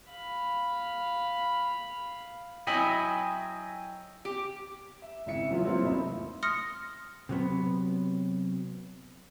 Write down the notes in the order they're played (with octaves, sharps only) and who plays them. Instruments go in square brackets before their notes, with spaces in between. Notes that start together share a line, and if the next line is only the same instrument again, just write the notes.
[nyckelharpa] F5 B5
[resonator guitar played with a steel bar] F#3 E4 [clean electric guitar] D#5 E5 B5 [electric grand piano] G5 G#5
[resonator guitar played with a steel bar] G4
[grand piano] E5
G#1 C#3 E4 E5 C#7
E3 F#3 A3 B3 C#4 F4
F#3 G3 A#3 C4 E4 F4
A1 C3 A3 D#4 E5 B5
[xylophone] C6 D#6 F6 A#6 C#7
[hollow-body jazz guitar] C3 F#3 B3